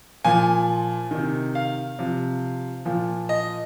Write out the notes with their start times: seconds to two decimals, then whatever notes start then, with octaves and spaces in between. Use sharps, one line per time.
0.25 A#2 F3 G#5
1.11 C3 D#3
1.55 F5
1.99 C3 F3
2.86 A#2 F3
3.29 D#5